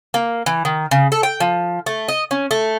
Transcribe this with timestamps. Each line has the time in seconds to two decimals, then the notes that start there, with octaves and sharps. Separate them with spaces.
0.14 A#3
0.46 E3
0.65 D#3
0.91 C#3
1.12 A4
1.23 G5
1.40 F3
1.86 A3
2.08 D#5
2.31 C#4
2.51 A3